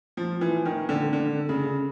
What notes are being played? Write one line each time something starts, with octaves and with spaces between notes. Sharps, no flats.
F3
E3
D#3
D3
D3
C#3